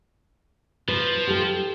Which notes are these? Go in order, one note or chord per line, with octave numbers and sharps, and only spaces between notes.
F3 B4
G4 A4